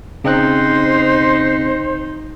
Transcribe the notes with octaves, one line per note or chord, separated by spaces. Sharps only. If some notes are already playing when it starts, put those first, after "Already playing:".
C#3 C4 D#4 C5 F#6